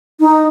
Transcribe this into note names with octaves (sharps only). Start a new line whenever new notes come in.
D#4